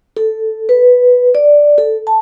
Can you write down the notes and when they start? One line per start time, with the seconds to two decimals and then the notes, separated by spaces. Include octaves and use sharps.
0.17 A4
0.69 B4
1.35 D5
1.78 A4
2.07 A5